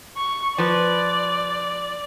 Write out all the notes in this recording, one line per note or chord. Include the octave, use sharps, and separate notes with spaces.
C#6
F3 B4 D5